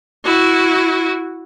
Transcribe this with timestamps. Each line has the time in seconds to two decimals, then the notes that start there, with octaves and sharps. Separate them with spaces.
0.25 E4 F#4